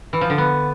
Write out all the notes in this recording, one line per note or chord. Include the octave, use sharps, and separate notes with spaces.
E3
F3
D3
B3